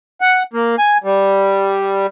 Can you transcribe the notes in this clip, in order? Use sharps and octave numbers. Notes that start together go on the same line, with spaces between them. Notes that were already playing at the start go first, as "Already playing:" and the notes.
F#5
A#3
G#5
G3